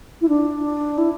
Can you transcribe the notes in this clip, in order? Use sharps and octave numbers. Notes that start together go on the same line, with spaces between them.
E4
D4
E4